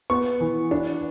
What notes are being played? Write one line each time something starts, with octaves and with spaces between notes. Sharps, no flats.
B3 C#6
E3
D4